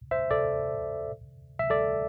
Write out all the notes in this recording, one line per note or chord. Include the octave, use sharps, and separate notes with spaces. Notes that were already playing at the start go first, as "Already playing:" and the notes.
C5 E5
A4 D5
E5
A4 D5